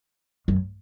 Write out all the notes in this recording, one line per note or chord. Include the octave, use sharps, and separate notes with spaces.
F#2